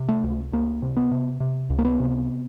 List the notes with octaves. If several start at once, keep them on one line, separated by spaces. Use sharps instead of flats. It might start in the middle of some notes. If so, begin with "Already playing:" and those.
Already playing: C3
A3
C#2
C#2 A#3
C3
B3
C3
C3
C#2
A#3
B3
C3